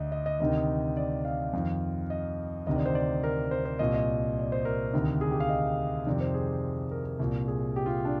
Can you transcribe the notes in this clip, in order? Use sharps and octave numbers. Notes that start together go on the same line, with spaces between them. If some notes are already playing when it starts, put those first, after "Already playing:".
Already playing: D2 D3 D#5
D#5
D#5
D2 C3 D#3 D#5
D5
F5
F2 D#3
D#5
D2 C3 D#3 D#5
D5
C5
D5
A#4
C5
C5
C2 A#2 D#5
D#5
D5
C5
A#4
D2 C3 D#3
G#4
G4
F5
D#5
F2 C3 D#3 D5
C5
G#4
A#4
A#4
C2 A#2
G#4
G4
F4
D4